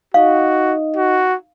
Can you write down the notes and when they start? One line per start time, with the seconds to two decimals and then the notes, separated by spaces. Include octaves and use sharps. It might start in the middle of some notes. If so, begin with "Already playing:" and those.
0.14 D#4 F#4 D#5 F5
0.96 F#4